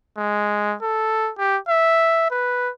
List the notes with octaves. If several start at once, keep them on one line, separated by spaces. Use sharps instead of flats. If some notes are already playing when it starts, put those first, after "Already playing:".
G#3
A4
G4
E5
B4